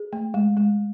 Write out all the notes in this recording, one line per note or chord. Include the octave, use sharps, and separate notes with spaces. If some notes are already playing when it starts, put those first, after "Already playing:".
Already playing: G#4
A3
G#3
G#3